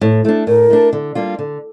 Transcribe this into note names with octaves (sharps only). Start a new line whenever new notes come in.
A2
A3 D4
A2 A#4
A3 D4
D3
G3 A#3 D4 F4
D3